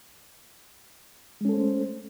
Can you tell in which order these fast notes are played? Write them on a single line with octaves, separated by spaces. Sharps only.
G#3 C#4 A4 C5 A3